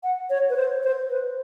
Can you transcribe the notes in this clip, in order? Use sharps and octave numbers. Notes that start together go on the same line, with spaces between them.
F#5
C#5
B4
C5
C5
B4